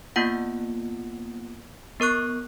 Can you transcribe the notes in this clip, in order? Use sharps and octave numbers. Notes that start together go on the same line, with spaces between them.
A#3 B3 F4 F#5
B3 A#4 C#6 F#6